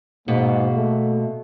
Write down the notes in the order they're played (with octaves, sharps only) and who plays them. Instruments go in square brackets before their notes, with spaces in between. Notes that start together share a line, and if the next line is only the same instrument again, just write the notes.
[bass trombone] G#2 [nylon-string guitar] B2 [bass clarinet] A#3
[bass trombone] A3